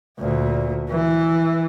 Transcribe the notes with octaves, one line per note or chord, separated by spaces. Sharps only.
D2 A#2
E3